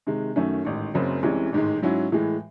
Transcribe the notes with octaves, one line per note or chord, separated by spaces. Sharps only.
C3 D#3 G#3
F#2 D#3 F#3 A3 C#4
A1 G#2 D#3
F#1 F#2 C#3 F#3 C4
C2 C3 E3 G#3 C#4
A1 G#2 D#3 G#3
G#2 F#3 C#4 E4
A2 E3 G#3